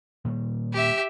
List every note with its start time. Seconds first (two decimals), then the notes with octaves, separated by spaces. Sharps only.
0.25 A#2 D#3 G3
0.73 G4 E5